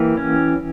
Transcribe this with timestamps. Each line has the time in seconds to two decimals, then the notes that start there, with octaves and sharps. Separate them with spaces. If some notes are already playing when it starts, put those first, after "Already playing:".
Already playing: E3 A#3 G4
0.17 C#4